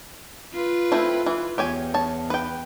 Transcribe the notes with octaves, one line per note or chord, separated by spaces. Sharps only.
F4 B4
A3 C4 E4
E3
E2 G4 C#5 G#5
C#5 A5
B4 G5